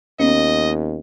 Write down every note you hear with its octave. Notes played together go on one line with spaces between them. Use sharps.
D#2 B3 C#4 D#5